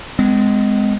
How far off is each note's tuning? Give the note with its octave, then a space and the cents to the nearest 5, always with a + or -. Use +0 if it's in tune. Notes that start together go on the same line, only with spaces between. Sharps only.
G#3 +0 C4 -45